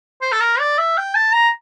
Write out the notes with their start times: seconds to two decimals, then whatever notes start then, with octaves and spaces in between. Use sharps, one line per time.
0.22 C5
0.32 A4
0.40 A#4
0.60 D5
0.78 E5
0.97 G5
1.15 A5
1.34 A#5